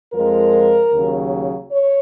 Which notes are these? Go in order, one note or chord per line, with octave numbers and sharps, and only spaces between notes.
F2 F3 G#3 A#4
D#2 C#3 F#3
C#5